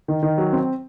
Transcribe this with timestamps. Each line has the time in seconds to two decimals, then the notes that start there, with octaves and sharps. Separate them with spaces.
0.08 D#3
0.23 D#3
0.38 F#3
0.53 C4